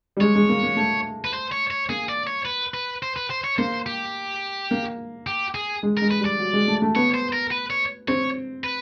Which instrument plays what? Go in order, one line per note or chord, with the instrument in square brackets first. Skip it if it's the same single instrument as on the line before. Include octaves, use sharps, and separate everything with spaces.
[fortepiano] G3
[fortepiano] G#3 [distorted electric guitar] C#5
[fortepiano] G#3
A#3
A#3
A3
[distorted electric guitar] B4
C5
C#5
C#5
[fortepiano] A#3 [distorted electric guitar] G#4
[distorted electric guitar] D5
C#5
B4
B4
C5
B4
C5
C#5
[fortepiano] A#3 [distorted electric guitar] C5
[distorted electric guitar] G4
[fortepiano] A#3
[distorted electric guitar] G4
G#4
[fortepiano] G#3
[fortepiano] G#3 [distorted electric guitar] A#4
[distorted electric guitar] B4
[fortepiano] G3
[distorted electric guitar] D5
[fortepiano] F#3
G#3
A3
A3
[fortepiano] B3 [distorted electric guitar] C#5
[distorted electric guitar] C5
A#4
B4
C#5
[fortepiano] C4 [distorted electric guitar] C#5
[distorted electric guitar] B4